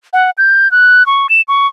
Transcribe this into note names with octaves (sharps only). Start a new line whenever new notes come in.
F#5
G6
F#6
C#6
E7
C#6